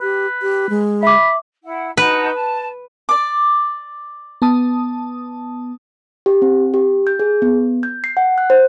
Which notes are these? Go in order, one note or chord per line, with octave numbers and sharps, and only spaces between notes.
G4 B4
G4
G#3
E5 B5 D6
E4 F#5
D#4 F#4 B4 A5
A5
D5 D6
B3 A5 D#6
G4
C4
G4
G6
G#4
B3
G6
C7
F#5
F#6
C5